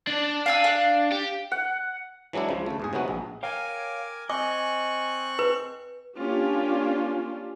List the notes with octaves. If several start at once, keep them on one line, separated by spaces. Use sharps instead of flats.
D4 D5
F5 G#5 E6
F5
G4
F#5
E3 F#3 G#3 D4 E4
C#2 C#3 F3
D2 A3
E2 G#2 G#4
C3 F#3 G#3 B3 F#4
A#1
A#4 C#5 F5 G5 G#5 D6
C4 D#5 G#5 C#6 D6 F#6
B4
A#3 C#4 D4 F4 G4